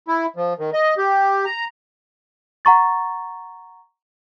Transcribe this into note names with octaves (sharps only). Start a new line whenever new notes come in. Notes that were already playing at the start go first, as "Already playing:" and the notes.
E4
F3
D#3
D#5
G4
A#5
F#5 A#5 C#6 A6